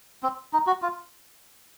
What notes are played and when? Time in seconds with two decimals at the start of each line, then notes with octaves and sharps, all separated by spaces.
0.23 C4
0.53 D#4
0.67 F#4
0.82 F4